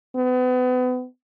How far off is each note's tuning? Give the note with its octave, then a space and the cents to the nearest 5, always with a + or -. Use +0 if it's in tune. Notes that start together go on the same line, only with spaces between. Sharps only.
B3 +35